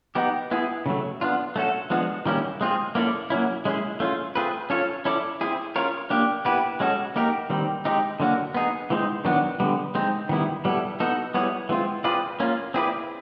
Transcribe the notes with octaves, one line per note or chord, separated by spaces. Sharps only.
B3 D#4 G4
B3 E4 G#4
C#3 F#3 A3
B3 D4 F4
A3 C#4 F#4 A4
F3 G#3 B3 D4 F#4
D#3 G3 A#3 C#4 E4
G#3 C4 F4 G#4
A#3 C#4 E4 A4 D5
F#3 A#3 C#4 E4
G#3 C#4 E4 G#4
A3 C#4 F4
A3 C4 F4 G#4 B4
C#4 F4 A4 C#5
C#4 E4 A4 D5
C4 E4 G#4
C#4 F4 A#4 C#5
A#3 D4 G4
B3 E4 G4 B4
G#3 C#4 F#4 A4
A#3 D#4 G4 A#4
D#3 G3 C4
G#3 C4 D#4 G4
D3 F#3 A#3 D4 F#4
B3 D#4 G#4
E3 G#3 C4 D#4
D#3 F#3 B3 D4 F#4
D3 G3 B3
G#3 C4 D#4
D#3 G3 B3 E4
G3 B3 E4 A4
B3 D#4 F#4 A4
G3 B3 E4 G#4 C#5
E3 G#3 C4 F4
C4 F4 G#4 B4 D5
A#3 C#4 F4
C4 E4 G#4 B4 D5